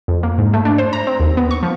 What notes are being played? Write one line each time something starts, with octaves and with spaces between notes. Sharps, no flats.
F2
A#3
G#2
A3
D4
C5
A#5
C4
D#2
B3
C#6
F3